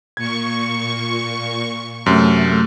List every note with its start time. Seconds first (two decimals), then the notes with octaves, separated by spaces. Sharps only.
0.17 A#2 C#6 G#6
2.06 F#2 C3 A3